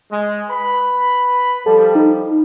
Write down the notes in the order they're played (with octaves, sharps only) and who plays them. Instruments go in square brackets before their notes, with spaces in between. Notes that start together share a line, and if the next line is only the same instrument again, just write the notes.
[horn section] G#3
B4 B5
[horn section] F3 G3 [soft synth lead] A4
[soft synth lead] D#4